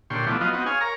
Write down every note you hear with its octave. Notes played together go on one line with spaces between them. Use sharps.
A#2 D3 G4 C#5 C6
E3 F3 A3 B3 D4
F3 F#3 B3 F4 D#5
B3 C4 D#4 F#4
G#4 C#5 F5 G#5
A#4 C#5 A#5